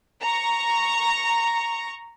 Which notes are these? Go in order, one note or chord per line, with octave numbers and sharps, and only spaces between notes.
A#5 C#6